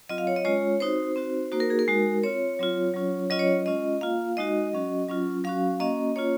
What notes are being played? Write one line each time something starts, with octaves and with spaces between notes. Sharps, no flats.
F#3 C4 F4 D#5
F5
C#5
D#5
G#3 C#4 F4 C#5
C4 D#4 F#4 C5
C4 D#4 F#4
A#3 D#4 F#4 C5
A#4
G#4
A#4
G#3 D#4 F#4
C4 F4 C#5
F#3 C4 F4
F#3 C#4 F4
F#3 C#4 F4 D#5
C#5
D#5
G#3 C#4 F4 D#5
A#3 F4 F5
G#3 D#4 F#4 D#5
F#3 C#4 F#4
F#3 C#4 F4
F#3 C#4 F#4 F5
A#3 C#4 F#4 D#5
A#3 C#4 F4 C#5